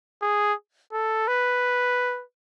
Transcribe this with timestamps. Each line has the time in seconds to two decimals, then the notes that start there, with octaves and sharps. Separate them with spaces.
0.22 G#4
0.93 A4
1.28 B4